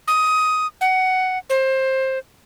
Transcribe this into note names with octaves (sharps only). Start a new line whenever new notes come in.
D#6
F#5
C5